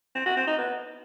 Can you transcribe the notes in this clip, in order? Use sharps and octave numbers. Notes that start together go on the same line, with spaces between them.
C4
F#4
C4
D#4
B3